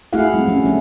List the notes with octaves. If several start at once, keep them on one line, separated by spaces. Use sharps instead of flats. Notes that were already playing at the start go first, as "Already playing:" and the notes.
A3 E4 F#4 G#4 F5 F#5
G3 C4
F#3 C#4
F#3 A3 D4